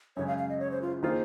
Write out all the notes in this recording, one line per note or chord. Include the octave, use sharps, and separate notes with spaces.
F#2 C#3 G#3 C#5
F5
F5
D#5
C#5
C5
F4
D#3 A#3 F4 G#4 C5